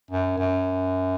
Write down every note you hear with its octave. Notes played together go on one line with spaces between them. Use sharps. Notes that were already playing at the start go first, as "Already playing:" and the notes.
F#2
F#2